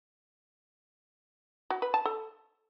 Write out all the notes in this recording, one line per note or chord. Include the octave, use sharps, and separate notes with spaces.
F#4
B4
A5
A4